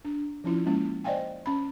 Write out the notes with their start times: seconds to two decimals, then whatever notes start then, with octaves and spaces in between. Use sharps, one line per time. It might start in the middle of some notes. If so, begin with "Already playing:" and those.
0.05 D4
0.44 F3 C#4 E4 F4
0.66 G#3 A#3 C#4 E4
1.04 C5 D5 D#5 F5 G5 G#5
1.46 C#4 B5